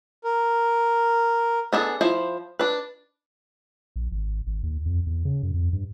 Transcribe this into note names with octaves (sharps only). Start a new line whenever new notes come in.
A#4
B3 D4 G#4 A4
F3 E4 C5
D4 B4
A#1
G#1
G#1
D#2
F2
E2
C#3
F#2
F2
G2